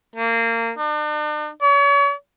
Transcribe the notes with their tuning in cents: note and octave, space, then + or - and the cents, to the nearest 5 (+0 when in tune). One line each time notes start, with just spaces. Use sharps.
A#3 -25
D4 +45
C#5 +40